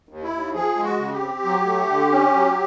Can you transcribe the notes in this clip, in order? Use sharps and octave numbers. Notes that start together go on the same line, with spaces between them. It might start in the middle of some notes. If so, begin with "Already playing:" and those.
D#2
E4
D#2
F3 G#4
G#3
F#4
C#3
G4
C4
F#3
A3
D3
C#4
F#3